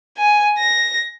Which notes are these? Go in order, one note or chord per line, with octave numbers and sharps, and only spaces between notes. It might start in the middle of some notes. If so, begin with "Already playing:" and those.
G#5
A#6